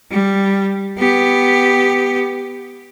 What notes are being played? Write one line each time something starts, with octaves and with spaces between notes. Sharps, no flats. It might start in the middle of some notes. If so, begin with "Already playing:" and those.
G3
B3 G4